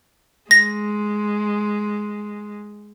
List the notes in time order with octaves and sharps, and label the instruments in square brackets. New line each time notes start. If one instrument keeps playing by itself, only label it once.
[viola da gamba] G#3 [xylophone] A#6